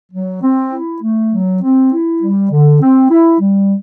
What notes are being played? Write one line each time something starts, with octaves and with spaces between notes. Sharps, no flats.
F#3
C4
E4
A3
F#3
C4
E4
G3
D3
C4
E4
G3